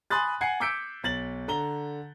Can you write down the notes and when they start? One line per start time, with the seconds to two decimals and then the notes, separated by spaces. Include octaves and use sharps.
0.10 G#5 B5 C6 D#6 F#6 A6
0.41 F#5 G#5 G#6 C7 C#7
0.60 D6 E6 G6 B6 C#7 D7
1.03 B1 A6 F#7
1.48 D3 A#5 G7